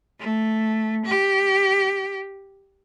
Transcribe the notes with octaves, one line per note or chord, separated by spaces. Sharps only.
A3
G4